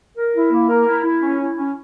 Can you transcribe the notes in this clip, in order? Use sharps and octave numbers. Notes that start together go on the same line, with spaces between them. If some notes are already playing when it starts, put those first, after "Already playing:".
A#4
E4
A#3
A#4
E4
E4
C#4
E4
C#4